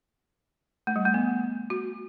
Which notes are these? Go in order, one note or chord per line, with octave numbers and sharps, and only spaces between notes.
A3
G3
A3
B3
F#4